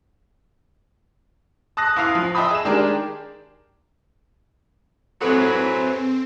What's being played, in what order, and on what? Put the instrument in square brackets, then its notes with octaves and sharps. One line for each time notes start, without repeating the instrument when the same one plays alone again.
[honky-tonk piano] A5 D#6 F#6 A#6
A1 E4 F5 D#6 C7 F7
F3
D#5 E5 G5 A5 B5 D#6
G#4 E7
D#3 G#3 D4 G4 G#4 A#4
[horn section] F#3 E4 B4 [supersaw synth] C4 [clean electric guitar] G#4 C5 F#5 [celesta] A4